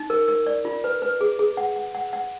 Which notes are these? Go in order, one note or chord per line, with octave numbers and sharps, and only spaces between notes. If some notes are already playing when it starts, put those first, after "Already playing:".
Already playing: D#4
A#4
A#4
D5
F4
B4
B4
G#4
G#4
F#5
F#5
F#5
F#5